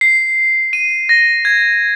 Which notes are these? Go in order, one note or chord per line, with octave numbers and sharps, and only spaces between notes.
C7
D#7
A#6
G#6